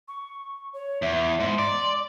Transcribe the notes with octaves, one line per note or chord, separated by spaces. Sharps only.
C#6
C#5
E2 E5
G#2 C6
D5